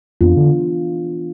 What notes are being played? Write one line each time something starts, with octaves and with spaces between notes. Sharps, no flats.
F2 E3 B3 D4 F4
D3